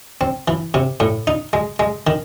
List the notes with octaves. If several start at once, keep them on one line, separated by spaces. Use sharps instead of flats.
C4
E3
C3
A2
D#4
G#3
G#3
D#3